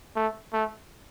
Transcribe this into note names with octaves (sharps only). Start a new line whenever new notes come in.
A3
A3